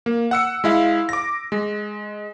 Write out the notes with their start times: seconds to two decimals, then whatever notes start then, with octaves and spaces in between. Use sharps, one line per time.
0.06 A#3
0.31 F#5 E6 C#7
0.64 G#3 E4 F5
1.09 D6 A#6
1.52 G#3